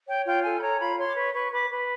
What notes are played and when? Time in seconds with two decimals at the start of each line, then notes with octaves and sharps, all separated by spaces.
0.08 C#5 G5
0.26 F4 G5
0.44 A4 G#5
0.58 B5
0.62 C#5 A#5
0.80 F4 B5
0.98 C#5 C6
1.08 D6
1.16 B4 C#6
1.34 B4 C#6
1.52 B4 D6
1.70 B4